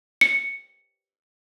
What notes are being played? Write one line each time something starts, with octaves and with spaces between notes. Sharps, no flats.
C#7